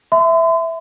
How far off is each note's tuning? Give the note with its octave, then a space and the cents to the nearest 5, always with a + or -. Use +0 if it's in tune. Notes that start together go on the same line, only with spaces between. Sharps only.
E5 +0 C6 -45